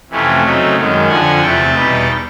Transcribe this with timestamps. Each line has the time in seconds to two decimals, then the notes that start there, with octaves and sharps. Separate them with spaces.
0.10 F2 C3 E3 A3 C#4
0.43 C#3 F#3 A3 C4 D#4
0.76 F#2 D#3 G#3
1.08 F2 D3 F3 F#5 G#5
1.41 E2 C3 E3 A3 G5 A5
1.75 E2 B2 G3 B3 D#4